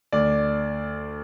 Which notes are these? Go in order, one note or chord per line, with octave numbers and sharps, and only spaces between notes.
D2 D5